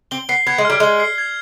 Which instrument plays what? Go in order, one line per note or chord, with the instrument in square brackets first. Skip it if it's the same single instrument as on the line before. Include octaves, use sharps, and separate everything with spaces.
[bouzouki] C4 [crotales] G7
[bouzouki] B3 [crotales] C7
[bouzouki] B3 [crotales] G#6
[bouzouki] G#3
[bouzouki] G3 [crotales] F6
[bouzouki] G#3 [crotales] G7
[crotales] C7
G#6